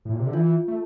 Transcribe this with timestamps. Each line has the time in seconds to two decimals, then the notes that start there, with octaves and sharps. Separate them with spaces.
0.05 A2
0.13 A#2
0.20 C3
0.27 D3
0.33 E3 F4
0.68 A3